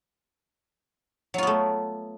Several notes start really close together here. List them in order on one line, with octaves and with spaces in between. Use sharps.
F#3 F4 B3 A3